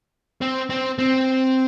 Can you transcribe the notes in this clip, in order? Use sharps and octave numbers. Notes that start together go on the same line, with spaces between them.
C4
C4
C4